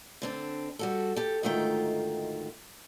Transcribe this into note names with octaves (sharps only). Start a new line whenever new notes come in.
D3 C4 D4
G3 F#4 A4
G4 A4
D2 G#2 D#3 A3 F4 G5